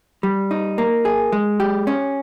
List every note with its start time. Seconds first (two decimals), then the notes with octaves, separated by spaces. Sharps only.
0.23 G3
0.51 D#4
0.78 A#3
1.05 G#4
1.32 G#3
1.60 G4
1.87 C#4